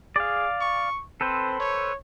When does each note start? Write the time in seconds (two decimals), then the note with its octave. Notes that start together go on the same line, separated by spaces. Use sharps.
0.16 G#4 D5 F5
0.61 C#6
1.21 C4 A4 B4 C5
1.60 C#5